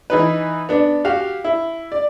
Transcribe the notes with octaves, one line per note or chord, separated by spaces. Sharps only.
E3 D#4 B4
B3 D4
F#4 G4 F5
E4
D5